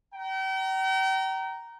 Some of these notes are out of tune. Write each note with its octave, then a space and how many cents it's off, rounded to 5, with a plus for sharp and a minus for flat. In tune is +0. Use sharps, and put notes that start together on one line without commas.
G5 -40 A#5 +0